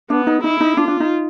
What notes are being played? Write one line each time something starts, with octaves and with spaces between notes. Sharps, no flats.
B3 D4
D#4
D#4 E4
D#4
D4 F4
D4
D#4